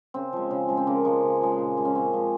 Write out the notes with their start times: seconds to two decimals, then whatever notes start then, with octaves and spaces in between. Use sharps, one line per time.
0.14 C#3 C4
0.33 F3 G#3
0.51 C#3
0.69 F3 G#3
0.77 C4
0.87 C#3 A#3
1.05 F3 G#3
1.23 C#3
1.41 F3 G#3
1.59 A#2
1.77 F3 G#3
1.85 C#4
1.95 A#2 C4
2.13 F3 G#3